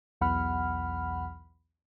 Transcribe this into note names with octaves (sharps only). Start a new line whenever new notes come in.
B1 E2 F#5 B5 F6